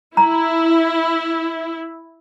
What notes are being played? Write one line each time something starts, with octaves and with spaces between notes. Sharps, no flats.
E4 A#5